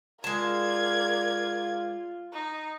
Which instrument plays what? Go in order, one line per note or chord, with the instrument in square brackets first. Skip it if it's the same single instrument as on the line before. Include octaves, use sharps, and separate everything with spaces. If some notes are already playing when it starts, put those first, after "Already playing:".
[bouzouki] G#3 A5 [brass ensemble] F4 [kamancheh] A#4 D5 [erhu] G#6
[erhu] D#4